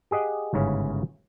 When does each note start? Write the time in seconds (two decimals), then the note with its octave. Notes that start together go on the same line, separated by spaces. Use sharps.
0.11 G4 G#4 D#5 F#5
0.54 G1 G#2 C#3 C#4 E4